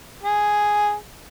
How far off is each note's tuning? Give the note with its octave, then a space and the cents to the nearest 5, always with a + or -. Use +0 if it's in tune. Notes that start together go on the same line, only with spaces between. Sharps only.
G#4 +0